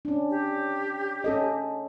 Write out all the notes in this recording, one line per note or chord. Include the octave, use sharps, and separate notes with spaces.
C#4 D4
G4
C#4 A4 D#5